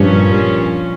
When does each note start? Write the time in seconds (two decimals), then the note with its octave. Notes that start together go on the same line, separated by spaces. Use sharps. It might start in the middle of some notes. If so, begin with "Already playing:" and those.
Already playing: G2 A#2 F3 C#4